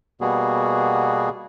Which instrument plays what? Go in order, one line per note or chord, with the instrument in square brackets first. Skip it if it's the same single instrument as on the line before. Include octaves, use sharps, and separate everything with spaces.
[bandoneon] B2 G3 A#3 B3 F#4 G#4